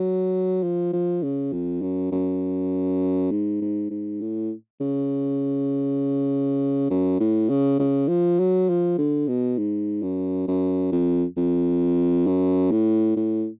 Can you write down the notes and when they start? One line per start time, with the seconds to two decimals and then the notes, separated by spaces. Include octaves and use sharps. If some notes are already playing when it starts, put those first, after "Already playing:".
Already playing: F#3
0.63 F3
0.93 F3
1.23 C#3
1.53 F2
1.82 F#2
2.12 F#2
3.31 G#2
3.61 G#2
3.91 G#2
4.21 A2
4.80 C#3
6.90 F#2
7.20 A2
7.49 C#3
7.79 C#3
8.08 F3
8.39 F#3
8.69 F3
8.98 D3
9.28 B2
9.58 G#2
10.02 F#2
10.48 F#2
10.92 F2
11.37 F2
12.27 F#2
12.72 A2
13.17 A2